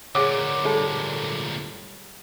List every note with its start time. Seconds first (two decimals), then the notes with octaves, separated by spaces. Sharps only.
0.15 D2 A#2 G#4 C#5 F#5 D6
0.65 G3 G#3 A4